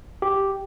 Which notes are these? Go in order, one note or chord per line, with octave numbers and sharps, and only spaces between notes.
G4